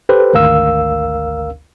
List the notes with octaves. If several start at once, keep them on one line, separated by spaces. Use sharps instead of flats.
G4 A4 B4 C5
G#1 D2 A#4 F5 E6